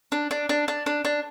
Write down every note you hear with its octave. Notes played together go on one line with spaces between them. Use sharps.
D4
D4
D4
D4
D4
D4